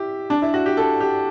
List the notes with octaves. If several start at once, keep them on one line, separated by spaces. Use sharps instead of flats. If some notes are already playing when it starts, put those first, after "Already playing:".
Already playing: E4 G4
D4
E4
F#4
G4
A4
G4